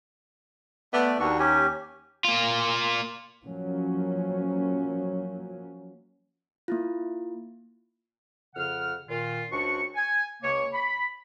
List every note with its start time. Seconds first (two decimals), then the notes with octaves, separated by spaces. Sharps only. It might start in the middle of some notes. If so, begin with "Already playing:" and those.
0.93 A3 B3 D5 E5
1.20 D#2 D4 F#4 C#6
1.39 C#4 G4 G#5
2.24 A#3 F4
3.45 F3 F#3 A#3 C#4
6.68 A#3 E4 F4
8.55 F2 C#3 F#5 F6
9.08 A#2 D#3 F4
9.50 C#2 D4 F#4 C5 C#6
9.96 G#5
10.42 C#2 C#3 A#3 C#5
10.73 B5